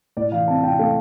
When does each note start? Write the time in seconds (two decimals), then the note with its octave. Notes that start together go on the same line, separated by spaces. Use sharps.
0.17 A2 D5
0.32 E3 F5
0.48 C4 A5
0.63 C4 G5
0.79 A3 F5